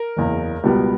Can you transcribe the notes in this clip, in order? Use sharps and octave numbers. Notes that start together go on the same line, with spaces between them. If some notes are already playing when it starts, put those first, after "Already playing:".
Already playing: A#4
F#1 E2 C#3
C#2 B2 G3 B3